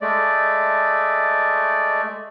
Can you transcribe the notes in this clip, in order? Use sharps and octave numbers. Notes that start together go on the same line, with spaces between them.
G#3 A3 D5